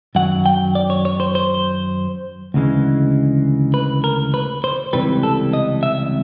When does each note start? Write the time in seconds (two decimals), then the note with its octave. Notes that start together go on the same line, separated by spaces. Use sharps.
0.15 F#2 D#3 F#3 F#5
0.46 G5
0.75 D5
0.90 C#5
1.05 C#5
1.20 C5
1.35 C5
2.54 D2 C#3 E3 G#3
3.74 B4
4.04 A#4
4.34 B4
4.64 C5
4.93 C#2 C3 E3 G3 B4
5.23 A4
5.53 D#5
5.83 E5